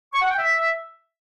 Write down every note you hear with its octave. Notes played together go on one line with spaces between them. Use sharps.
C#6
F#5
G5
E5